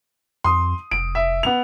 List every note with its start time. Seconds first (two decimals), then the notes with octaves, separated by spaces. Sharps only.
0.44 F2 C6 D#6
0.91 F1 D7
1.15 E5
1.43 B3 F7